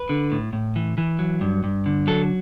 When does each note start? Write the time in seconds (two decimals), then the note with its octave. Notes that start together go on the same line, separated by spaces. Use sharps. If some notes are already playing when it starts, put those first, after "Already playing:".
Already playing: B4
0.09 D3
0.32 A2
0.53 A2
0.76 E3
0.98 E3
1.19 F#3
1.41 G2
1.64 G2
1.86 D3
2.07 F#3 A4